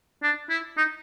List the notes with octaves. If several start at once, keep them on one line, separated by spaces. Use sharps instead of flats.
D4
E4
D#4